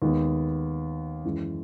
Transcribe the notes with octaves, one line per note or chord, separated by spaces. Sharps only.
D#2 D#3 G#3 B3
F#2 E3 G#3